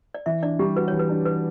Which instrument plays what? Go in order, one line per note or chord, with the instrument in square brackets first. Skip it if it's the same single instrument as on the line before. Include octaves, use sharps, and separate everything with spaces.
[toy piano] D5
[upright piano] E3 [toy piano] E5
[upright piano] D4 [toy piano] D5
[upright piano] G3 [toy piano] G4
[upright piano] F#4 [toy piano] B4
[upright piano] E3 [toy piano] C#5
[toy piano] B4
[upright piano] D4
[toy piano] B4